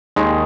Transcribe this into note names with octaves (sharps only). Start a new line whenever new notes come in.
D#2 D#3 G#3